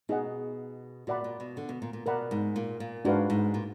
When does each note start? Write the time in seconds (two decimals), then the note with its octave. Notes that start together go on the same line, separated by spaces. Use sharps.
0.09 B2 D#4 G#4 D#5 F#5
1.07 A#2 F#4 D5 F#5 B5
1.24 A#2
1.40 B2
1.57 D3
1.69 B2
1.82 A#2
1.93 A#2
2.06 B2 A#4 D5 F#5 B5
2.31 G#2
2.56 A#2
2.80 A#2
3.05 G#2 D4 F#4 B4 F5
3.30 G#2
3.54 A#2